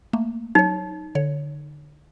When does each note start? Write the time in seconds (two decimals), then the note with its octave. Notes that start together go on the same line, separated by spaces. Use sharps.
0.13 A3 A#3
0.55 F#3 D#4 C#5
1.15 D3 C#5